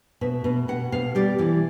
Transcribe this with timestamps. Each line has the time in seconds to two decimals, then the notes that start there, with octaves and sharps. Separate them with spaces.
0.21 B2 E5
0.44 B2
0.68 B2 F#5
0.92 B2 F5
1.15 G3 D5
1.38 E3 D5